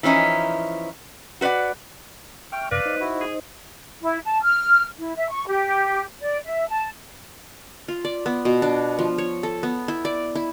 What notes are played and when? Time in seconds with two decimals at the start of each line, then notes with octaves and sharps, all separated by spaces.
0.03 E3 F3 C#4 D#4 E4
1.41 F#4 B4 C#5 D5 F#5
2.52 E5 G5 C#6 F6
2.71 F#2 C3 B4 D5 F5 A#6
2.85 D#4 C5 D#5
3.00 E4 F#4
3.21 G#4
4.02 E4
4.26 A5
4.43 F6
4.98 E4
5.16 E5
5.30 C#6
5.47 G4
6.21 D5
6.46 E5
6.69 A5
7.88 F4
8.05 D5
8.26 B3
8.45 B2
8.62 D4
8.99 F3
9.18 C#5
9.43 A4
9.63 B3
9.88 E4
10.05 D5
10.35 E4